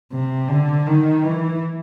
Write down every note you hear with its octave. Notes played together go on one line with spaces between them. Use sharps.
C3
D3
D#3
E3